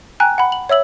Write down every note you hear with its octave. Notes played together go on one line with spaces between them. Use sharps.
G5 G#5 A#5 F#6
F#5 B5
F#7
C#5 E5 E6 F#7